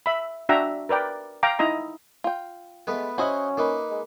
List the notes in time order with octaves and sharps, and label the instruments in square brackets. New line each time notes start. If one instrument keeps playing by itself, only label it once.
[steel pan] E5 B5
D4 F#4 E5 G5 A#5
A#4 B4 D5 G5
F5 G5 A#5 D6
D#4 E4 D#5 A#5
[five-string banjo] F4 G5
[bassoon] G#3 [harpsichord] A3 B3 B4
[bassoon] C#4 [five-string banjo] E4 F#4 [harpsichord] C5 D#5 F#5
[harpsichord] A#3 D#4 B4
[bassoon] G#3